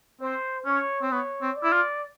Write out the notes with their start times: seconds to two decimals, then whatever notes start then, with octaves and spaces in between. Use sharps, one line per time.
0.21 C4 C5
0.66 C#4 C#5
1.02 C4
1.11 B3 C#5
1.42 C4
1.56 D5
1.63 E4
1.72 F4